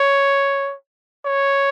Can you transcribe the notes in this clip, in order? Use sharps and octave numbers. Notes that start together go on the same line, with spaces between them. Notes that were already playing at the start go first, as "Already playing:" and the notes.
Already playing: C#5
C#5